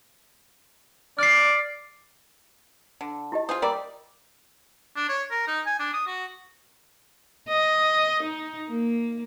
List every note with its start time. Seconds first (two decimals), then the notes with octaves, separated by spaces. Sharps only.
1.19 D5 F6 C7
3.01 D3
3.32 E4 G4 D#5
3.49 F4 G#4 C5 D#6
3.62 G3 A#3 A#4 D5
4.96 D4
5.09 C#5
5.31 A#4
5.48 D#4
5.66 G#5
5.79 D4
5.93 D#6
6.07 F#4
7.49 D#5
8.23 D#4
8.70 A#3